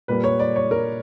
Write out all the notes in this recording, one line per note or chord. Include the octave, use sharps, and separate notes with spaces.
A#2 G3 A#3 B4
C#5
D5
C#5
A#4